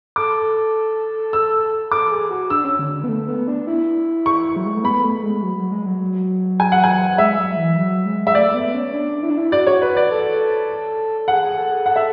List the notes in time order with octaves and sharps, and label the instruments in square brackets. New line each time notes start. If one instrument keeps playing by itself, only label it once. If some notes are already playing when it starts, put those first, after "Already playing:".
[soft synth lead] A4 [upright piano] D6
[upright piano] E6
[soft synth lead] A4 [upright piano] D6
[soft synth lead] G#4
F#4
[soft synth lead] D4 [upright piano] E6
[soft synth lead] C#4
D3
D3
B3
A3
B3
D4
E4
[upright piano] C#6
[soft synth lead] F#3
G#3
A3
[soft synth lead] B3 [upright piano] B5
[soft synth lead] A3
G#3
F#3
F#3
G#3
F#3
[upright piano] G#5
F#5
G#5
[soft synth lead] G#3 [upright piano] E5
[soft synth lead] F#3
E3
F#3
G#3
[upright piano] E5
[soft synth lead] A3 [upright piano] D5
[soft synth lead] B3
C#4
D4
E4
D4
E4
[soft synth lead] F#4 [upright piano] D5
[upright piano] C#5
B4
D5
[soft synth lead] A4
[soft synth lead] G#4 [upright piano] F#5
[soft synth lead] G#4
A4
G#4
[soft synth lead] A4 [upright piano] F#5
[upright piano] E5